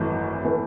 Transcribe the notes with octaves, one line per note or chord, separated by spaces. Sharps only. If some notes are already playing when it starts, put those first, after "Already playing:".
Already playing: G#1 F#2 E3 A3
E3 A3